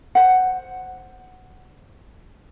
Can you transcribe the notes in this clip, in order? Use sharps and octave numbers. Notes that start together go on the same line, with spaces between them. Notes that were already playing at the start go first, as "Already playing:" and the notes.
C5 F#5